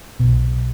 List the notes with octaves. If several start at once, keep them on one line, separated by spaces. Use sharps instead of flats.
B1 B2